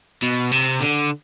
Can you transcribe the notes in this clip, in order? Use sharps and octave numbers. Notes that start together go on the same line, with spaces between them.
B2
C3
D3